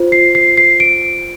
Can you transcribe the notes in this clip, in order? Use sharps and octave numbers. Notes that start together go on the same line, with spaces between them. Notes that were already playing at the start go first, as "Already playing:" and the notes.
Already playing: F4 C5
C7
C7
C7
D7